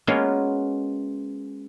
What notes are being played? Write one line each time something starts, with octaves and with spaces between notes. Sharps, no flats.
G#3 A#3 B3 C#4 F4 F#4